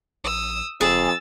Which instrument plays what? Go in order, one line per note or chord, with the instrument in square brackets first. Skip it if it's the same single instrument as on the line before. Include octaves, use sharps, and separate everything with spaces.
[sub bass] A#1 [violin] D#6 E6
[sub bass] F#1 [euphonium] F2 [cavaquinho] G#4 [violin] E6 A6